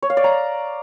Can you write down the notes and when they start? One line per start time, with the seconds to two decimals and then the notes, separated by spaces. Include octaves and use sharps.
0.02 C#5
0.10 F5
0.17 D5
0.24 A#5